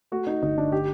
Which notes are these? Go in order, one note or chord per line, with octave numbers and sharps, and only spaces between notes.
A3 F#4
D#4
G1 D#4
D4
G4